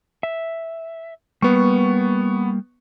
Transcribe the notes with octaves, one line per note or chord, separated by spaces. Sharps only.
E5
G3 A#3 B3 C#6